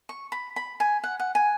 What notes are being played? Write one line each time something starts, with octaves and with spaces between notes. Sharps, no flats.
C#6
B5
B5
G#5
F#5
F#5
G#5